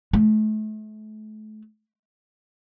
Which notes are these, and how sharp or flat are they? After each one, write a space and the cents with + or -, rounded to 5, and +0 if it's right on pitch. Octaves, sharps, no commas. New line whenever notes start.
A3 -35